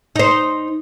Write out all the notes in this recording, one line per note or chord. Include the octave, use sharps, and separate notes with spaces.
D#4 C5